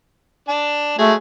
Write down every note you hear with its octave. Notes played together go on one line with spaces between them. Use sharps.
D4 A5
F#3 G#3 A3 G#4